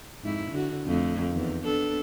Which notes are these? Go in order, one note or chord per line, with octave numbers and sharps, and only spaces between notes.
F2 G#2 E4
D3 F#4
F2 A3
E2 D#3
B3 D4 A4